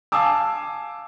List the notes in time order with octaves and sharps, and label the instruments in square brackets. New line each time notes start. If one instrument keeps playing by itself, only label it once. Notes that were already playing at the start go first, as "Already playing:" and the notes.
[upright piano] F5 G#5 A5 D6 E6